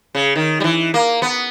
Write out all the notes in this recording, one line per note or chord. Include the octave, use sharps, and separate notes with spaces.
C#3
D#3
G3
E3
A#3
B3